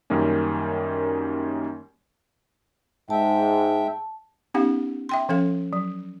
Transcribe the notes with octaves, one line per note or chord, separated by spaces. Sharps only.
F#2 D#3 G3 A#3 C#4
G#2 G#3 E5 G5 A5
B3 C#4 D#4 G4 F5 F#5
E5 G5 C6
F3 C#4 A4 F5
F#3